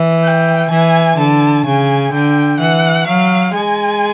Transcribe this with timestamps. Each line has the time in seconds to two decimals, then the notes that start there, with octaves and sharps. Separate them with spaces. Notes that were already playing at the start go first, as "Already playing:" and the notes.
Already playing: E3
0.24 G5
0.70 E3 G#5
1.18 D3 A5
1.65 C#3 G#5
2.13 D3 G5
2.60 E3 F#5
3.07 F#3 F5
3.54 G#3 G#5